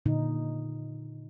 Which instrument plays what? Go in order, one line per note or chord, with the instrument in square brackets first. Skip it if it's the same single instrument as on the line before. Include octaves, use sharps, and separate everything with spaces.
[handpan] A#2 D3 D#4